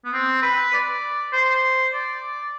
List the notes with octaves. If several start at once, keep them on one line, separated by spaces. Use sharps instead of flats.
B3
C4
B4
D5
C5
D5